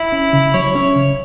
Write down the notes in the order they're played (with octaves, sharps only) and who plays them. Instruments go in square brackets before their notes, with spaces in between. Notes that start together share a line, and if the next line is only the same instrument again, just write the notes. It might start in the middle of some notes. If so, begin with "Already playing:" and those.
Already playing: [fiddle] E4
[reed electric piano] C#4
C#3
[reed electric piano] F#3 [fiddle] C#5
[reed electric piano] C#4
C#3